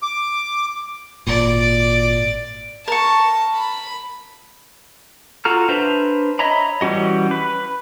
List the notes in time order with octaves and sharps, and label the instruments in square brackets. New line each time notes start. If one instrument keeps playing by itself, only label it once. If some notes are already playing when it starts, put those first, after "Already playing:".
[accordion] D6
[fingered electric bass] G#1 A#2 [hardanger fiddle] D5
[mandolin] A#4 C#6 [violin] A5
[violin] B5
[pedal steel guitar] F4 F#4 A4 A#5 F6
D4 B4 C5 E5 A#5
C#5 D#5 E5 A#5 B5
E3 G3 C#4 F#4 D#5
B4